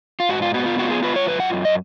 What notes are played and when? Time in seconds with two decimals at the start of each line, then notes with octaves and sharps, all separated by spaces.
0.20 F4
0.29 G#2 F#4
0.42 F4
0.54 B3 F#4
0.66 F4
0.79 F4 F#4
0.91 G#4
1.03 F4 B4
1.16 C#5
1.27 F#2 B4
1.40 F#5
1.53 F#2
1.65 D#5